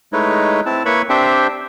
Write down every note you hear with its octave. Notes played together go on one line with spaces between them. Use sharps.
G#3 A3 D#4 E4 B4 C#5
C4 E4 A5
A#3 E4 B4 C#5 B5 C#6
C4 D4 G4 C5 E5 G5